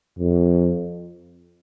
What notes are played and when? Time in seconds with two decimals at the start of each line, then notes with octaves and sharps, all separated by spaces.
0.19 F2